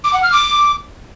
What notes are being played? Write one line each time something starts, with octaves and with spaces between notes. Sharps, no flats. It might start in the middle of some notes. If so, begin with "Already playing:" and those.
D6
F#5
F6
D6